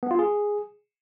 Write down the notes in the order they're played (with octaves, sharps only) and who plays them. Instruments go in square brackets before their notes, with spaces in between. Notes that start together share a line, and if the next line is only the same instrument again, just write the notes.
[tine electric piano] B3
F4
G#4